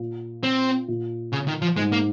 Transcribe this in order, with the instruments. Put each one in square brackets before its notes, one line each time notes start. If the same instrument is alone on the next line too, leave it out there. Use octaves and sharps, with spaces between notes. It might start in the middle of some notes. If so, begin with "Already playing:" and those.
Already playing: [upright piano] A#2
[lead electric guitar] C4
[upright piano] A#2
[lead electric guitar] C#3
D#3
F3
[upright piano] G#2 [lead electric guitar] G#3
[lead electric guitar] A#3